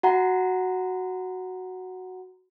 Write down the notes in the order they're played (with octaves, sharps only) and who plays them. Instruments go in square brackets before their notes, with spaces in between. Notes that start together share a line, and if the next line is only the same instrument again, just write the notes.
[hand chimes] F#4 F#5 A#5